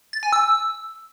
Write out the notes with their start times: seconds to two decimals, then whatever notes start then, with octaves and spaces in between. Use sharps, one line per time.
0.13 A6
0.23 G#5
0.33 E6